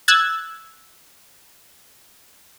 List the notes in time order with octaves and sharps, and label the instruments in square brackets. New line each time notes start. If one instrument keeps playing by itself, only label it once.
[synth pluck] E6 F#6 G#6 A6